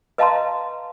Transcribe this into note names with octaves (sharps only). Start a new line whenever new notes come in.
B4 D#5 F5 A5 A#5 C6